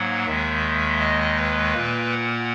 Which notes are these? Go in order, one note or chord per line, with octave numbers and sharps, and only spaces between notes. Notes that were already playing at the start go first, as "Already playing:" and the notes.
Already playing: G#2 F#3 A#3 F#5
D#2 D#3 G#3 E5
D#5
B4
A#2 A#3
F#5